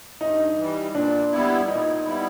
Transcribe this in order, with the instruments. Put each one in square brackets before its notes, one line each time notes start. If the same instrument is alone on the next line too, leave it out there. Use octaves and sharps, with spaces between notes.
[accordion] G2 [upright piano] D#4
[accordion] E3 G3
[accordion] A#2 [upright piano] D4
[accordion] G3 B3 E4
[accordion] A#2 [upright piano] D#4
[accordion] G3 B3 E4